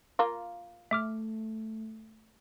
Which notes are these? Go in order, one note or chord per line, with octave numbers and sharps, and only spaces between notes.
A#3 F4
A3 E5 D6 F6